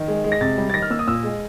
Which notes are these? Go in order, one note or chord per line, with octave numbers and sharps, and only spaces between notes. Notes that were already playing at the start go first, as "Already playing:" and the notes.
Already playing: D#3
G#3
G#3
A#6
C3 A6
G3
A6
D#3 A#6
F6
A#3 E6
D#6
A#2 E6
G#3